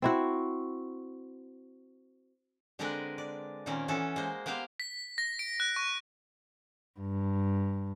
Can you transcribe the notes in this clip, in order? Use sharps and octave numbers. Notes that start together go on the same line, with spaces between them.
C4 E4 F#4
D3 G#3 C4 D4 A#4 B4
D5
A#2 D#3 A#3 C4 C#4
E3 C#4 F#4 A4
G#3 A#3 C5
A#3 B3 G4 C5 F5
B6
A#6
D7
F#6
C#6
G2